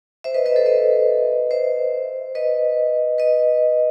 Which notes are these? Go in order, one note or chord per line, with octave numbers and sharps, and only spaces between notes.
C5 E5
B4 D#5
B4 D#5
A4 C5
B4 D#5
C5 E5
B4 D#5
B4 D#5